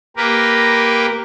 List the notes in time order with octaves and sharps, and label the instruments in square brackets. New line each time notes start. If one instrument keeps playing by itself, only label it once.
[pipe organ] A#3 G4 A#4 B4